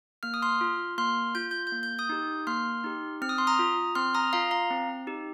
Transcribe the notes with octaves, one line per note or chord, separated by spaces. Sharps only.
A#3 F6
D#6
C6 F6
F4
A#3 C6 F6
F4 G6
G6
G6
A#3
G6
D#6 G6
D#4 G4
A#3 C6 F6
D#4 G4
C4 F6
D#6
C6
A#5 D#6
F4
C4 C6 F6
A#5 D#6
F4 F5 A#5
F5 A#5
C4
D#4 G4